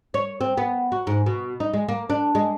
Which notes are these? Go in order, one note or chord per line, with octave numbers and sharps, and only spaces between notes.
C#5
C4
B3
F#4
G#2
B2
D#4
G#3
A#3
D4
G#3